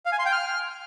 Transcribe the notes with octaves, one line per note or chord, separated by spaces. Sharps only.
F5
G#5
C6
G5
F6